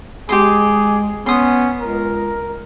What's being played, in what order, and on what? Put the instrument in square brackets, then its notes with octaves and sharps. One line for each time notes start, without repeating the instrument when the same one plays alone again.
[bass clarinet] G#3 [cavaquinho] G4 D#5 C6 [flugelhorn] G#4
[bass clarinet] B3 [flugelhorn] C#4 [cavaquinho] C6 D#6
[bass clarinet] C#2 [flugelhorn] A#4